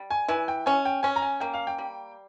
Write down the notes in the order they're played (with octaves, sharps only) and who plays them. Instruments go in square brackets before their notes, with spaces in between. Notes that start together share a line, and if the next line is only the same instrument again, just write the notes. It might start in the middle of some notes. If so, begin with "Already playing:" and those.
Already playing: [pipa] G3
[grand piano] G#5
[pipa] E3 [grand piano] G#5
[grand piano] G5
[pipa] C#4 [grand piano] G#5
[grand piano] G5
[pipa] C#4 [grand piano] G#5
[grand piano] A#5
G#5
[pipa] A#3 [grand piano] G5
[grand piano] F5
G5
[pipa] G3